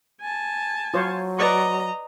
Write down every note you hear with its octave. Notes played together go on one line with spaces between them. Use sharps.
G#5 A5
F#3 F4 C5 C#5
B4 D5 D#5 A#5 C#6